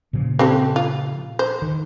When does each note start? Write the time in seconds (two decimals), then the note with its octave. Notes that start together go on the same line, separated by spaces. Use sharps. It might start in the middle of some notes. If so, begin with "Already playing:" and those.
0.13 A#2 C#3 F3
0.39 C4 G4 A4
0.76 F4
1.39 C5
1.62 D#3